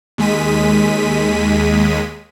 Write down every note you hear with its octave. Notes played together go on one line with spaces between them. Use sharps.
D#2 G#3 B6 D#7